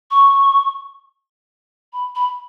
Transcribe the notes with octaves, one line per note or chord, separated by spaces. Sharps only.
C#6
B5
B5